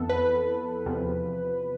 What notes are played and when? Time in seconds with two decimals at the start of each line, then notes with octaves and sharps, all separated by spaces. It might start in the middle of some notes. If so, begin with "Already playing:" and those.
Already playing: F2 E3 B3 A4
0.09 B4
0.86 E2 C3 F3